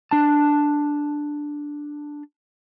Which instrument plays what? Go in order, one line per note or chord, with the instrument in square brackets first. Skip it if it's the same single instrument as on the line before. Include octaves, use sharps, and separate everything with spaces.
[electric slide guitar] D4 A5